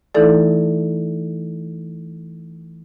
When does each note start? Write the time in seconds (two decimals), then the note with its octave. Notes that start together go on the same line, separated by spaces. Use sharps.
0.14 E3 A3 D#4 E4 A4 D5